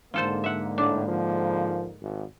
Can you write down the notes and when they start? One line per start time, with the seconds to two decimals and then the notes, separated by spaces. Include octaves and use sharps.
0.14 G#2 D3 A#3 F4 A4 C5
0.44 E5 F#5
0.78 A2 D4
1.08 F3
2.02 G#1